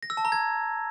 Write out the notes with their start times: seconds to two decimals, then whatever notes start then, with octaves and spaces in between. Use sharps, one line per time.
0.03 A#6
0.10 E6
0.17 A5
0.25 A#5
0.32 G#6